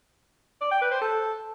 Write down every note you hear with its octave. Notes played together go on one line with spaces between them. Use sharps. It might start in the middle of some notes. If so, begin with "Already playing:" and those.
D5
G5
B4
C5
A4